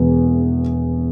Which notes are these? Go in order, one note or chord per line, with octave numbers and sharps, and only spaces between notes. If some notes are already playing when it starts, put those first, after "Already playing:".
Already playing: E1 E2